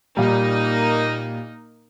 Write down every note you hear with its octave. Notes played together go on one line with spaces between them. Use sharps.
A#2 G3 A#3 D#4